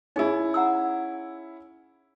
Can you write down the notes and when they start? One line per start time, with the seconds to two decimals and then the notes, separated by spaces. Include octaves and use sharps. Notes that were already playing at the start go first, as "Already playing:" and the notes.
0.16 C#4 D#4 E4 G#4
0.54 F#5 A#5 E6